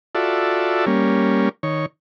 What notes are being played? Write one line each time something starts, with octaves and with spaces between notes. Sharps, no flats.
F4 F#4 A4 D5 E5
G3 A#3 C#4
D#3 C#5